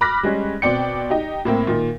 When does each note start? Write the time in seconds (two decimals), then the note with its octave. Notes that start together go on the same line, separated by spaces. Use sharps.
0.01 B5 D6 F6 F#6 A#6 B6
0.23 G3 G#3 C#4
0.62 B2 C4 D5 G5 C#7
1.10 D#4 G4
1.45 A2 A#3 C4
1.67 A#2 D#3